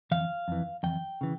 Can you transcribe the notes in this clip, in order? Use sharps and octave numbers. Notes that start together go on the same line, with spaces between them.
F2 E3 F5
F2 E3
F2 E3 G5
C#3 E3